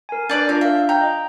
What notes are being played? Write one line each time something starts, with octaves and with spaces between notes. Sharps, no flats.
A#4 G#5
D4 B4 D5 A5
D4 F4 A#4 D5
E5 F5
G5 A#5
D#5